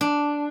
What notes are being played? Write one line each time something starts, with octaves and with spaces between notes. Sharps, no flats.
D4